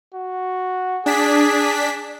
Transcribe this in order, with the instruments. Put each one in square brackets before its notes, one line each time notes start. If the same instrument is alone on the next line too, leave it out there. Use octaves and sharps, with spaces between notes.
[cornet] F#4
[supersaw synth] D4 B6 [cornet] G#4